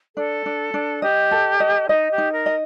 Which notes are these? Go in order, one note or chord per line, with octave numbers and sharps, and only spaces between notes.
D4 A4
D4
D4
G4 D#5
A4
D#5
D#4 D#5
G4
D#4
A#4
D#5